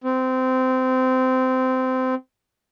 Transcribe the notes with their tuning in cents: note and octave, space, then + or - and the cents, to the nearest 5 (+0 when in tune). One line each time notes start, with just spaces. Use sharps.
C4 -20